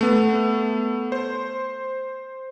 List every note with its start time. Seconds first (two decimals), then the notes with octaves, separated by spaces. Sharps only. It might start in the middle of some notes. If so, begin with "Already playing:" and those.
0.01 A3 B3
1.12 C5